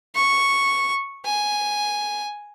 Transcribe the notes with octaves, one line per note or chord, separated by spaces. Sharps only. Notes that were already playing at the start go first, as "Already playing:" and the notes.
C#6
G#5